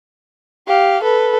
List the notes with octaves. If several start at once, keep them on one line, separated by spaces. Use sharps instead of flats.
G4 F5
A4 B4